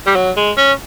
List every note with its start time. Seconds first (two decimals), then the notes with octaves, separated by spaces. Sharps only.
0.07 G3
0.16 F#3
0.37 G#3
0.57 C#4